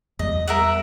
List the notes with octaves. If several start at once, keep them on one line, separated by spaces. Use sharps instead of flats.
E2 G3 D#5
A#4 E5 F#5